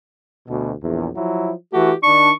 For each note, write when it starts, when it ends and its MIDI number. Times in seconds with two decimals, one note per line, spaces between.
0.47 0.72 38
0.47 0.72 47
0.83 1.08 34
0.83 1.08 40
1.16 1.52 53
1.16 1.52 54
1.16 1.52 64
1.73 1.92 52
1.73 1.92 57
1.73 1.92 66
1.73 1.95 67
2.03 2.29 51
2.03 2.29 62
2.03 2.32 85